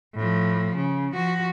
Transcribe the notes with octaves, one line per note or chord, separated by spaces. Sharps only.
A2 F3
C#3
F3 F#4